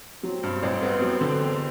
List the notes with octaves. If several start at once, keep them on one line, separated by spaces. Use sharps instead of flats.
F#3 C4
G2
A1
B3
F#3
D3
E2